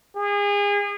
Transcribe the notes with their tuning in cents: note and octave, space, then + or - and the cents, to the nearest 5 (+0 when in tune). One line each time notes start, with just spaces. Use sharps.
G#4 -35